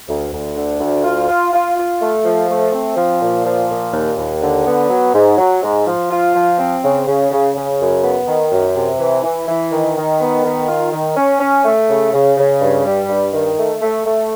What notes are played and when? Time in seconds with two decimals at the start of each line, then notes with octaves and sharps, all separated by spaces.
0.08 D2
0.33 D2
0.55 D3
0.80 D2
1.04 F4
1.29 F4
1.53 F4
1.77 F4
2.01 A3
2.24 F3
2.49 A3
2.72 C4
2.96 F3
3.21 A#2
3.45 F3
3.70 A#2
3.93 D#2
4.17 D#2
4.42 D3
4.66 B3
4.89 F#3
5.14 G#2
5.38 F#3
5.63 G#2
5.87 F3
6.11 F4
6.34 F3
6.58 C4
6.82 C#3
7.07 C#3
7.31 C#3
7.55 C#3
7.79 F#2
8.03 B3
8.28 D#3
8.51 F#2
8.76 C3
8.99 E3
9.23 E3
9.48 E3
9.71 D#3
9.96 D#3
10.20 B3
10.44 D#3
10.68 F4
10.92 D#3
11.16 C#4
11.40 C#4
11.65 A3
11.89 C#3
12.13 C#3
12.37 C#3
12.61 G2
12.85 G3
13.09 G2
13.33 D#3
13.58 A3
13.82 A3
14.05 A3